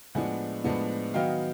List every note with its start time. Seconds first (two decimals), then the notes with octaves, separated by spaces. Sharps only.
0.15 A2 F3 G#3 B3 D4 F#5 G#5
0.64 A2 F3 G#3 B3 D4
1.14 D#3 F#3 B3 D#4 F5 G5